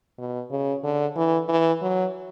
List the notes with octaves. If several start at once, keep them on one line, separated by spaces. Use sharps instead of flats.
B2
C#3
D3
E3
E3
F#3